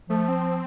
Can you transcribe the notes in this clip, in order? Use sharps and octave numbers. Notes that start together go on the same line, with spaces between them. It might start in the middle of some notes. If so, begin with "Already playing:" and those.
F3 A3
C4